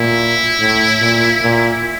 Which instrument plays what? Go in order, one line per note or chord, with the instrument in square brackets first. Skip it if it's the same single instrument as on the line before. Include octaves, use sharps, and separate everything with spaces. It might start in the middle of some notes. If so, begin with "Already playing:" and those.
Already playing: [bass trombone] A#2 [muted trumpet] E4
[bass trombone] A2
A#2
A#2